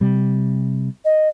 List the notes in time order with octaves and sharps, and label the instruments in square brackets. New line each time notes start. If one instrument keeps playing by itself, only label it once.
[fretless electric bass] C3 G3
[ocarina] D#5